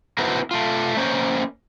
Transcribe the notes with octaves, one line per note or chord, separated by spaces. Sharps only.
B3 D#4 E4 F#4 A#4 C5
A3 F4
A#3 C#4 C5 C#5 D#5